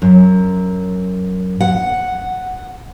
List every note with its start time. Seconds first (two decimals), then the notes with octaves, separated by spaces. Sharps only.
0.02 F#2
1.61 F#5